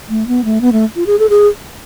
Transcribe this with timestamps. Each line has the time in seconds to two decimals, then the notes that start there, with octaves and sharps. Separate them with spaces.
0.09 A3
0.27 B3
0.44 A3
0.61 B3
0.72 A3
0.96 F4
1.06 G#4
1.19 A4
1.30 G#4